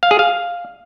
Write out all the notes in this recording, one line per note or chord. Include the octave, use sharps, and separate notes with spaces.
F5
G#4
F5